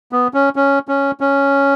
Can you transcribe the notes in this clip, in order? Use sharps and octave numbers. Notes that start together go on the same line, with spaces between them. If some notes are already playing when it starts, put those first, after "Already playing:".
B3
C#4
C#4
C#4
C#4